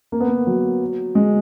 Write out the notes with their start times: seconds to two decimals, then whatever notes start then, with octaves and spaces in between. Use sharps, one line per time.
0.12 A#3
0.20 B3
0.28 A#3
0.47 F#3
1.15 G#3